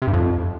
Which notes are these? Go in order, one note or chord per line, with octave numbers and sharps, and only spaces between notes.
C3
G2
F2